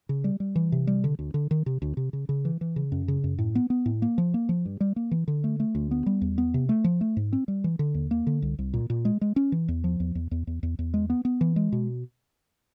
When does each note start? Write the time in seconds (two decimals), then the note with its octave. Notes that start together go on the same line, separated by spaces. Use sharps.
0.09 C#3
0.24 G3
0.40 G3
0.56 E3
0.72 C3
0.87 G3
1.04 D3
1.19 D2
1.34 D3
1.51 D#3
1.66 C3
1.82 D2
1.97 C3
2.13 C#3
2.29 C#3
2.45 E3
2.61 E3
2.76 C#3
2.92 F#2
3.08 C#3
3.24 F#2
3.38 A2
3.55 B3
3.70 B3
3.86 A2
4.02 A#3
4.18 F3
4.34 A#3
4.49 F3
4.65 G2
4.80 G3
4.96 A#3
5.11 E3
5.28 D3
5.44 A3
5.60 A3
5.75 D2
5.91 B3
6.06 G3
6.21 E2
6.38 B3
6.54 C3
6.69 A3
6.84 F3
7.01 A3
7.17 G#2
7.33 C4
7.48 G3
7.64 E3
7.79 D3
7.94 D#2
8.11 A#3
8.27 D3
8.42 C2
8.59 C2
8.74 A#2
8.90 A#2
9.05 G#3
9.21 G#3
9.36 C#4
9.52 E3
9.68 E2
9.84 F3
10.00 E2
10.15 E2
10.31 E2
10.47 E2
10.63 E2
10.79 E2
10.94 G#3
11.10 B3
11.25 B3
11.41 E3
11.56 G#3
11.72 B2